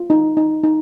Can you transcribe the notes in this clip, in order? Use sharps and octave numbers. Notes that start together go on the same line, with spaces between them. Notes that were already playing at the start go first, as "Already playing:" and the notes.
Already playing: F4
D#4
D#4
D#4